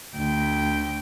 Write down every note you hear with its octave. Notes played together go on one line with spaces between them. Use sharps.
D2 G5